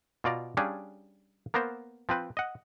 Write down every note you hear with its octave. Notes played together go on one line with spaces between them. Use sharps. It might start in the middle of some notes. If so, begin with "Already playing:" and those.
B2 F4 D5 A#5
G3 C#4 D4 G#4 F5
A#3 B3 A#4 C5
F3 C4 B4
D#5 F#5